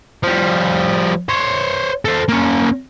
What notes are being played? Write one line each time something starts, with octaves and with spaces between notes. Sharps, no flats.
F3 G3
C5 C#5
A4 C5
A#3 C#4